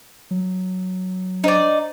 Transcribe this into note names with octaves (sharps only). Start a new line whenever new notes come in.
F#3
D4 D#4 C5 D5